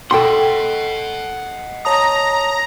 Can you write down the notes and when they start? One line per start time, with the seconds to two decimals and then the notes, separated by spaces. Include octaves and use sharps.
0.11 A4 D#5 F#5 G5 C6
1.85 C#5 A5 A#5 D#6